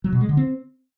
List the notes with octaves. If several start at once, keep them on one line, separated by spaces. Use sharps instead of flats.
F#3
B2
G#3
D3
C4